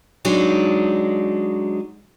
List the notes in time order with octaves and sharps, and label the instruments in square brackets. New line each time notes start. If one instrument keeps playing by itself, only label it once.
[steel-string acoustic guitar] F#3 G#3 D4 D#4